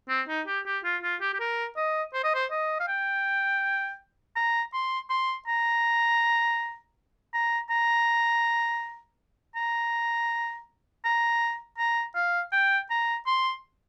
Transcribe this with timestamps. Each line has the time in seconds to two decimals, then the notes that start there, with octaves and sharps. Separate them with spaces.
0.09 C4
0.28 D#4
0.47 G4
0.66 G4
0.84 F4
1.03 F4
1.21 G4
1.34 G4
1.40 A#4
1.77 D#5
2.14 C5
2.24 D#5
2.35 C5
2.51 D#5
2.80 F5
2.88 G5
4.36 A#5
4.73 C6
5.10 C6
5.47 A#5
7.34 A#5
7.70 A#5
9.56 A#5
11.05 A#5
11.78 A#5
12.15 F5
12.53 G5
12.90 A#5
13.27 C6